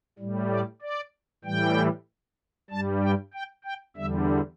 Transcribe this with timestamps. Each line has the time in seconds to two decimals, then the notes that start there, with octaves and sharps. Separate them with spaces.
0.19 A2 G3
0.50 D5
0.82 D5
1.45 A2 E3 G3 G5
2.70 G2 G3 A5
3.02 G5
3.34 G5
3.64 G5
3.96 E2 D3 G3 E5